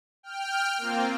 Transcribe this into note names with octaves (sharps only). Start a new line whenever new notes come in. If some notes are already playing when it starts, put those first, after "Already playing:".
G5 F6
A#3 C4 F4